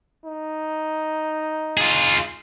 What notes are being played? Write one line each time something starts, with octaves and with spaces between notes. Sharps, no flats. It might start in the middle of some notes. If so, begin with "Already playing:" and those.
D#4
F4 G#4